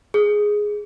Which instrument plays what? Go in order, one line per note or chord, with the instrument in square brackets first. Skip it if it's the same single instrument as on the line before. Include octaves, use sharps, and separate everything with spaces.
[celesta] G#4